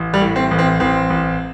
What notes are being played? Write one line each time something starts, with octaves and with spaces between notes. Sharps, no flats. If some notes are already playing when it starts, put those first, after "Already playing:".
Already playing: A1
G3
A2
C4
A1
C4
A1 C4
A1